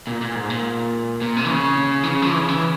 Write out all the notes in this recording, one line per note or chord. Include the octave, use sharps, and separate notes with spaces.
A#2
A#2
G#2
A#2
A#2
C3
E3
C#3
E3
C#3
F3
E3
C#3
E3